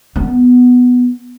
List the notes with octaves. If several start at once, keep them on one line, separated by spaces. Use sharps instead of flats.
B3